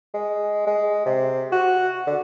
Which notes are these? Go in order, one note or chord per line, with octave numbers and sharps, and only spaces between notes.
G#3
G#3
C3
F#4
D3